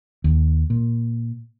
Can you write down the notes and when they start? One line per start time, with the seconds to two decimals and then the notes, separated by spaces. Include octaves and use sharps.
0.24 D#2
0.70 A#2